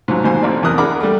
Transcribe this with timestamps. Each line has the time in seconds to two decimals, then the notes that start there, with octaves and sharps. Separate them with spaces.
0.08 G#2 F3 F#3
0.24 D#2 G#2 B2 C5 G#5
0.42 A1 C4 D5
0.63 E2 A2 C3 A#4 D#6 F#6
0.78 D4 G#4 A#4 F#5 B5 D6
1.00 G3 A3